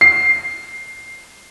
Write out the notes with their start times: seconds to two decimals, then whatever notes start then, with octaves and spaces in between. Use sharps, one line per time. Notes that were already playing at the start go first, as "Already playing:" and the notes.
0.01 C7